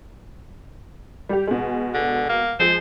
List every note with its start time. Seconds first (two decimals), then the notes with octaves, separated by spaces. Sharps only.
1.29 G3 G4
1.47 B2 G#3
1.94 D3
2.29 A#3
2.59 F3 G#3 C5